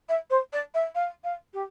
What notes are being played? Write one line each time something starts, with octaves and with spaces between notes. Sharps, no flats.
E5
C5
D5
E5
F5
F5
G4